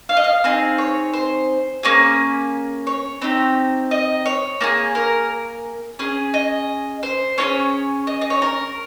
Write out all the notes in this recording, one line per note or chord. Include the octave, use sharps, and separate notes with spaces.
F5
D#5
F5
C4 D#4 G#4
C#5
C5
A#3 C#4 G#4
C#5
C4 D#4 G4
D#5
C#5
A#3 F4 G#4
A#4
C#4 G#4
D#5
C5
C#4 F4 G#4 C#5
D#5
D#5
C#5
A#4